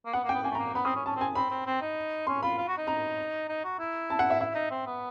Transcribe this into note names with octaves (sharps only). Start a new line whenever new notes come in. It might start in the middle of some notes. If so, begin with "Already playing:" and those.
A#3
B3 F#5
A#3 G5
B3
A#3 G#5
A3
A#3 A#5
B3 B5
C4 D#6
C#4
C#4 A5
C4
G#5
C4 B5
C4
C4
D#4
C#4 C6
F4 B5
F4
F#4
D#4
A#5
D#4
F#4
E4
A5
F#5
E5
E4 E5
D#4
C4
B3